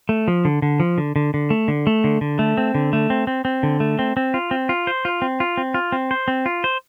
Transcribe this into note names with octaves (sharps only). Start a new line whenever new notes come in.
A3
F3
D3
D3
F3
D3
D3
D3
A3
D3
A3
D3
D3
A3
C4
D3
A3
C4
C4
C4
D3
A3
C4
C4
F4
C4
F4
C5
F4
C4
F4
C4
F4
C4
C5
C4
F4
C5